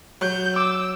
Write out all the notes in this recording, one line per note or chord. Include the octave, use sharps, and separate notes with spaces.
F#3 G6
D6 E6